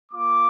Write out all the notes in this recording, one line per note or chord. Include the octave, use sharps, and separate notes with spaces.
A#3 F4 D6